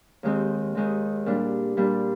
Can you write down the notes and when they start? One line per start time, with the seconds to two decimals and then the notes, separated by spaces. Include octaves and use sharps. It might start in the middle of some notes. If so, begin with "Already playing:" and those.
0.23 D#2 D#3 G#3 C4
0.75 D#2 D#3 G#3 C4
1.26 A#2 G3 D4
1.77 A#2 G3 D4